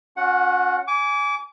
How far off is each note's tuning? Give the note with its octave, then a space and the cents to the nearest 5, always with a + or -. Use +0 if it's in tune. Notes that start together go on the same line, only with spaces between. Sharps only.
C#4 +20 F#4 -35 F#5 +0
G#5 +0 D6 -30